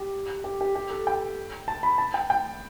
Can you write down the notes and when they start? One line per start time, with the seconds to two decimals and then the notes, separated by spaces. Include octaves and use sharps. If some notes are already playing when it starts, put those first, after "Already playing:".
Already playing: G4
0.44 G4
0.61 G4
0.75 G4
0.90 A4
1.07 G5
1.68 A5
1.83 B5
1.98 A5
2.14 G5
2.30 G5